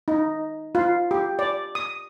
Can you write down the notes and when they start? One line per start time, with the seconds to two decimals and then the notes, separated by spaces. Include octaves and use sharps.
0.08 D#4
0.75 F4
1.11 G4
1.39 D5
1.75 D#6